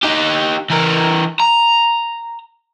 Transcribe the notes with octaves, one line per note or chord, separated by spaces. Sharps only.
D#4 G4
E3 A#4
A#5